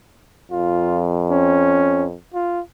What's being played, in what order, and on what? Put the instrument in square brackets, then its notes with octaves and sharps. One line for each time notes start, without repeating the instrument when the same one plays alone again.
[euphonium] F2 [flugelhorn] F4
[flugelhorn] C#4
F4